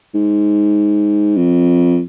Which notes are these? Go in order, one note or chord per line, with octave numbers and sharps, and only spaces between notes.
G#2
F2